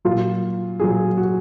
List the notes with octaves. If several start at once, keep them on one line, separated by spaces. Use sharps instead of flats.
A#2 F#3 F4
A#2 F#3 G#4
F#4